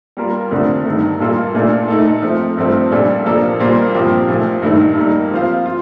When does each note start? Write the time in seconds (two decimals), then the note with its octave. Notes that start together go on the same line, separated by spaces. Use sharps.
0.17 G3 A#3 F4 A#4
0.51 F2 D3 A3 D4
0.86 G2 D#3 A3
1.20 A#2 G3 A#3 F4 A4
1.55 A#2 A3 D4 F4 A4
1.88 A3 D#4 A4
2.22 F3 A3 C4
2.57 G2 F3 A3 C4
2.91 A#2 G3 D4 A4
3.25 F3 A#3 D4 A4
3.60 A#2 G3 A#3 F4 C5
3.95 G2 F3 C4 G4
4.29 A#2 F3 A3
4.62 G2 D#3 A3 D#4
4.97 G3 A#3 D#4
5.31 F3 C4 F4 C5 F5
5.66 F4